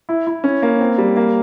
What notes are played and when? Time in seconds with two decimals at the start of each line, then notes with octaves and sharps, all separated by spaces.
0.09 E4
0.27 E4
0.44 C#4
0.62 A#3
0.80 C4
0.98 G3
1.17 A#3